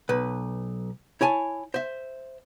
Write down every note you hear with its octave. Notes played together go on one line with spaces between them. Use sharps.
B1 B4
E4 C#5 G#5 A5
C5 E5